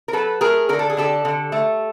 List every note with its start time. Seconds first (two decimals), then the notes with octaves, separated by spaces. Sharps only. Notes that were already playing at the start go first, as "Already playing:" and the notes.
0.08 A#4
0.13 F#3 A4 B4
0.41 A3 G#4 A#4
0.69 D3 A#4
0.79 A4
0.90 G#4
0.97 D3 G4 A4
1.25 D3
1.52 A3